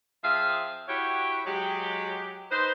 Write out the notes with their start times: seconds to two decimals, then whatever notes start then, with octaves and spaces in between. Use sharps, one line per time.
0.24 F3 C4 G#4 E5 F5
0.88 E4 F#4 G4 C#5
1.46 F#3 G#3 G4
2.51 D#4 B4 C5